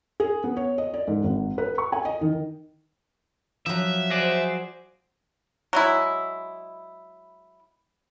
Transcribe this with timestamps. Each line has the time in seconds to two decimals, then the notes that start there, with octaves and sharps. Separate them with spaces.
0.20 G#4
0.44 B3
0.57 C#5
0.78 D#5
0.94 D5
1.08 G#2
1.24 G#1
1.58 B4
1.78 C#6
1.92 G#5
2.05 D#5
2.21 D#3
3.66 F3 F#3 E5
4.10 F#4 G#4 C5 D5
5.73 F#3 G#3 E4